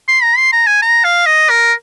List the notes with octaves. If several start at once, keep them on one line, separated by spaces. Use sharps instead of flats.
C6
A#5
C6
A#5
G#5
A#5
F5
D#5
A#4